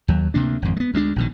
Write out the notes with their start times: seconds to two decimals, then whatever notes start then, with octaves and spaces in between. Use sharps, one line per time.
0.08 D#2 F#3
0.34 D2 C3 A#3 D4
0.62 G#1 F2
0.77 G#3 B3
0.94 D2 G#3 A#3 D4
1.16 A#1 B2 D#3